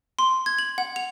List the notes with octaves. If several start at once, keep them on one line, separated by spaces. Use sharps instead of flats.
C6
G#6
F#7
F#5
F7